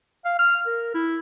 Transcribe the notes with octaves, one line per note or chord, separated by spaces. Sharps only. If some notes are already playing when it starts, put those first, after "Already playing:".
F5
F6
A#4
E4